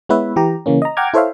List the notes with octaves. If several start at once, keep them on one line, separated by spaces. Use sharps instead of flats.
G#3 B3 E4 B4 C#5 E5
E3 G4 A#5
C#3 E3 A#3 C#4
D#5 A#5
F#5 G5 A#5 D6 F6 G#6
E4 A4 C5 C#5 E5 F5